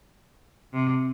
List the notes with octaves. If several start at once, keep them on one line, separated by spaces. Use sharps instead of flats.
C3